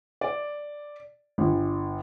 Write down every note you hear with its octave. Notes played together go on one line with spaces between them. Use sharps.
D5
G1